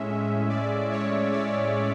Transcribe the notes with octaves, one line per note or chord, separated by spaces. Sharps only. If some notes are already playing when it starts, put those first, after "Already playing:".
Already playing: A2 G#3 C#4 E5
D5
C#5
D5